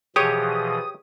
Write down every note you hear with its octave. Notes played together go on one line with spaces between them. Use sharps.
B2 E3 F3 G4 G#4 C#5 D#6